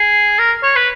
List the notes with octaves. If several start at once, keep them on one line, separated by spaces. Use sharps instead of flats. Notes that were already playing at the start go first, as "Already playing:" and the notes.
Already playing: G#4
A#4
C#5
B4